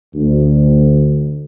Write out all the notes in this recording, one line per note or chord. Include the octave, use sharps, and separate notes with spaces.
D2